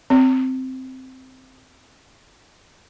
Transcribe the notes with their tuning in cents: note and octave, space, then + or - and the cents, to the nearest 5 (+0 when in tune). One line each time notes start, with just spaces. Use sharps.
C4 -5